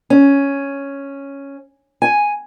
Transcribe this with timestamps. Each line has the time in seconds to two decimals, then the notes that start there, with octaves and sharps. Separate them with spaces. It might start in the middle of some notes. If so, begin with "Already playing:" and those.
0.10 C#4
2.02 G#5